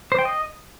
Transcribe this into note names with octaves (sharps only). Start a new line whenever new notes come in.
C5
G5
D#5